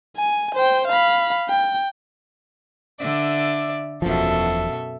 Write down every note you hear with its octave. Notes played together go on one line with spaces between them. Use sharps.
G#5
C5 G5
F5 B5
G5
D3 D5 E5
E1 F#2 B2 F3 A4 E5